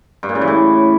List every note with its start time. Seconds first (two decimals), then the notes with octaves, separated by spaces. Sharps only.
0.23 G2
0.29 A#2
0.35 C#3
0.41 E3
0.48 A2